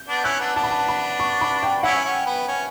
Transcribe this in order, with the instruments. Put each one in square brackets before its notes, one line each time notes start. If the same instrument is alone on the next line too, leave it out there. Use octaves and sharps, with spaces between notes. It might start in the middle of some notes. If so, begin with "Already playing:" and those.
Already playing: [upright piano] G6
[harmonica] B3 D4
[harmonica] C#4 E4 [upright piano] F#6
[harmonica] B3 D4
[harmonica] B3 D4 [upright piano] A5
[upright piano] B5
A5
B5
C#6
B5
G5
[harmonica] C#4 E4 [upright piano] F#5
[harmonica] C#4
B3
C#4